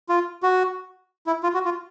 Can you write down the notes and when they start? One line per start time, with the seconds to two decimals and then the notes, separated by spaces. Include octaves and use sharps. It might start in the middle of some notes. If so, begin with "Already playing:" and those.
0.09 F4
0.43 F#4
1.27 E4
1.43 F4
1.54 F#4
1.65 F4